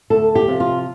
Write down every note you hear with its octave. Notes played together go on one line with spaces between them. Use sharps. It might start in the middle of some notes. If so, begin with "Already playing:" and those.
D2 A4
G4
C3 F3
F4